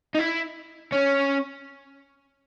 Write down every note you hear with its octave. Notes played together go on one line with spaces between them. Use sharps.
D#4
E4
C#4